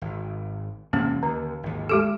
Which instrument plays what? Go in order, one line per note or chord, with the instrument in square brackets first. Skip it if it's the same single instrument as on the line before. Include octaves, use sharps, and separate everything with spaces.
[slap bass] G#1
[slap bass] E2 C3 G#3 [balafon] A#3 C#4
[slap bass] D#2 [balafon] D3
[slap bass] G#1 D#2
[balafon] G#3 G4 A4